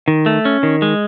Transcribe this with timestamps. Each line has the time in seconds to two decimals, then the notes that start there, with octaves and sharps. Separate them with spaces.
0.08 D#3
0.26 A3
0.45 C#4
0.63 D#3
0.82 G#3